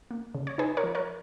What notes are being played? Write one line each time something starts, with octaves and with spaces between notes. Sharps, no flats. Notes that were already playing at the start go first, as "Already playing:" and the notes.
A#3
C#3
C#5
D#4 G#4 B4
A#4 C#5
F3
A#4 C#5